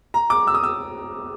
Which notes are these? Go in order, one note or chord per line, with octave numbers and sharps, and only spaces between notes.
A#5
D6
E6
D#6
E6